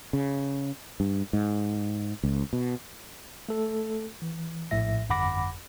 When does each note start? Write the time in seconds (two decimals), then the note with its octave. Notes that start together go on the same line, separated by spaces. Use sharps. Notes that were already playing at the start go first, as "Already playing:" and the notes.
0.13 C#3
1.00 G2
1.33 G#2
2.23 C#2
2.53 B2
3.49 A3 A4
4.22 E3
4.71 A#1 A2 E5 A#6
5.10 G1 F2 F#5 B5 D6 A#6